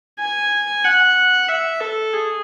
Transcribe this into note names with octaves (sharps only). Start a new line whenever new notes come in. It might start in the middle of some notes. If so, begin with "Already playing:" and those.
G#5
F#5
E5
A4
G#4